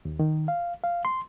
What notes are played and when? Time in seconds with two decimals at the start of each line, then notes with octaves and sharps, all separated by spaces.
0.05 D#2
0.19 D#3
0.48 F5
0.83 F5
1.05 C6